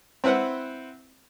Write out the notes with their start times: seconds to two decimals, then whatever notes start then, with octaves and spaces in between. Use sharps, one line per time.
0.24 C4 E4 B4 C5 F#5